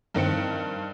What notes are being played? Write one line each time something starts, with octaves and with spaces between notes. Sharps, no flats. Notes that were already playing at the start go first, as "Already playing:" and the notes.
G2 D#3 C4 C#7